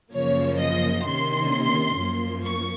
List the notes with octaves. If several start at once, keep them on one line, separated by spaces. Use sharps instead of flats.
F#2 C#3 F3 A#3 C#5
D#5
C3 D#3 A#3 C#4 C6
F#2 F3 A#3
C#6